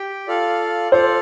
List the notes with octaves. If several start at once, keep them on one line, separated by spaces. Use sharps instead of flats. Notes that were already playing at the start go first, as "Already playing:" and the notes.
Already playing: G4 G5
F4 A4 D5 F5
F4 A4 C5 D5 F5